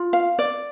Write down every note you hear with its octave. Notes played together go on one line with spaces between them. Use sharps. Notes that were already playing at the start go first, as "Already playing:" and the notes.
Already playing: F4
F5
D5